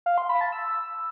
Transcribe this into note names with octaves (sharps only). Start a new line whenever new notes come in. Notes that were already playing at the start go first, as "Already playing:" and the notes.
F5
C6
B5
A5
E6